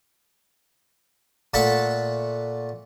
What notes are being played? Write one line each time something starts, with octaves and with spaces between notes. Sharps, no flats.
A#2 A3 A4 F#5 A5 B5